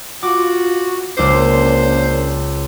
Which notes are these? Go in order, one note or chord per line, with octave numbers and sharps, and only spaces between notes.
F4 F#4 D6
C#2 A#3 C#4 D4 C5 D6